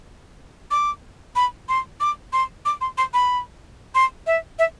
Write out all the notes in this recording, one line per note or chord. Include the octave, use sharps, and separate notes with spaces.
D6
B5
C6
D6
C6
D6
C6
C6
B5
C6
E5
E5